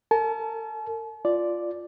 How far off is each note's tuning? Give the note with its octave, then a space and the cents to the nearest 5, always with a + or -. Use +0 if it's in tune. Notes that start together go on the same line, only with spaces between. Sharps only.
A#4 -45 A5 -45
F4 -5 D5 +0